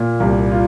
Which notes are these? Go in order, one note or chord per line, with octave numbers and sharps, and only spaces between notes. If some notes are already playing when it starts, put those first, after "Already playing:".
Already playing: A#2
C2
F4